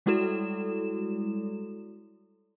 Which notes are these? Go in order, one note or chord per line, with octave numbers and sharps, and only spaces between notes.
G3 G#3 E4 F#4 A4 E7